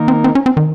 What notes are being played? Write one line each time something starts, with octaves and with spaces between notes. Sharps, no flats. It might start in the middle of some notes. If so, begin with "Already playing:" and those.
Already playing: D#3 A#3 D#4 A#4
C4
C4
C#4
C4
D#3